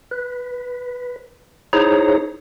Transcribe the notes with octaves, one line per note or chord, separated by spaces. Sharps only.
B4
D#4 E4 G#4 C5 C#5 A#5